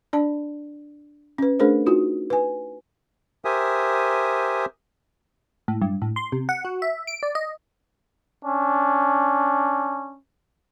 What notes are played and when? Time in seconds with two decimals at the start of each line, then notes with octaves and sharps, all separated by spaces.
0.13 D4 D5 A5
1.38 C#4 B4
1.59 A3 D4 G#4 A#4 C5
1.86 D#4 F4 F#4
2.30 B4 G#5
3.45 G4 A#4 C5 E5 G#5 D#6
5.68 A2
5.82 G2
6.02 A2
6.16 C6
6.32 C3
6.49 F#5
6.65 F#4
6.82 E5
7.07 D7
7.23 D5
7.35 D#5
8.44 C#4 D4